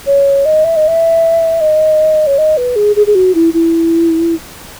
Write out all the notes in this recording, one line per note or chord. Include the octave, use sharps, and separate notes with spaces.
C#5
D#5
E5
D#5
E5
D#5
C#5
D#5
B4
G#4
G#4
G#4
F#4
E4
E4